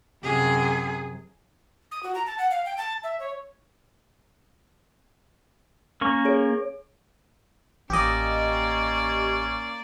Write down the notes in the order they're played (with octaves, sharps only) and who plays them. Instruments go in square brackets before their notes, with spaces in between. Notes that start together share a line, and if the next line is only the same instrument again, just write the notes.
[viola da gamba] F#2 C3 [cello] G#4
[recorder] D#6
F#4
A#5
A5
F#5
F5
G5
A5
E5
C#5
[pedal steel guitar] A#3 C#4 C#6
[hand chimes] G#4 C#5 D7
[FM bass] A1 [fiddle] A#3 D5 [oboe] C#4 [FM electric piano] G4 D#5